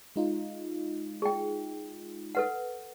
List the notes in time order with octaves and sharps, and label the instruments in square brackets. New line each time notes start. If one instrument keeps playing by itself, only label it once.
[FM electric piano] G#3 D#4 F4
[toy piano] G#4 G5
A4 B4 F#5